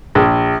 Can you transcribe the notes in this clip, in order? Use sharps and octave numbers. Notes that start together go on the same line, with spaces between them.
A#1